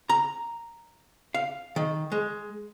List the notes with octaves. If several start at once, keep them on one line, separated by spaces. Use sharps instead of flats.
A#5
F5
D#3
G#3